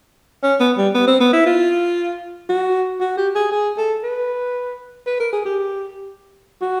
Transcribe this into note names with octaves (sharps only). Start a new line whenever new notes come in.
C#4
B3
G3
B3
C4
B3
E4
F4
F#4
F#4
G4
G#4
G#4
A4
B4
B4
A#4
G#4
G4
F#4